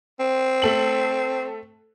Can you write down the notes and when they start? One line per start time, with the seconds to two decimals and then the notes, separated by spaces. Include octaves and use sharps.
0.20 C4
0.62 A3 A4 F#7